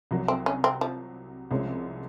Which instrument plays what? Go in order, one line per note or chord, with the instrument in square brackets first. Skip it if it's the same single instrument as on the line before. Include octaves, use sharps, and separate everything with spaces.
[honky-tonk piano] C2 C3 F#3
[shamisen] C4
C#4
C4
F3
[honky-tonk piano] C2 C3 F3 G#3 C#4